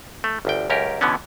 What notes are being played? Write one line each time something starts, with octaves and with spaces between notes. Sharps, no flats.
A3
G1 D2 G5
C#2 F#2 C#4 G4 A#4
B2 D3 E3 B3 C#4